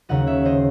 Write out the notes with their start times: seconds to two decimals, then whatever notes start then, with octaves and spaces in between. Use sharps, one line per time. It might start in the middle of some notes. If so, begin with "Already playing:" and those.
0.09 D#2 C#3 F#3 D#5 F#5
0.27 C#5 E5
0.45 C5 D#5